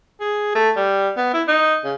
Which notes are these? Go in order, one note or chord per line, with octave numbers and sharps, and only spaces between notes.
G#4
A3
G3
B3
E4
D#4
C#3